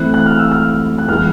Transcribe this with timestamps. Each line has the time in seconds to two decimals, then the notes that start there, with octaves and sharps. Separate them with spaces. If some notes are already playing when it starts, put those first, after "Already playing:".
Already playing: E3 A3 C4 E4 F#6
0.14 F#6
0.26 F6
0.39 E6
0.52 F6
0.98 F#6
1.08 E3 G#3 B3 E4 F6